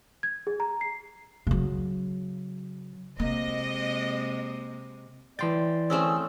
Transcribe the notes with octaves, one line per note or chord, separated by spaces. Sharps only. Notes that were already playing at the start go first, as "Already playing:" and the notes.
G#6
G#4
A#5
C7
C#3 F#3
C3 G#3 A#3 D#5
E3 D5 G5 C6 A6
A3 C4 C#4 G#4 E6